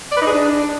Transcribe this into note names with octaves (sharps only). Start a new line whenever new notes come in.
D5
B4
D#4
G#4
D4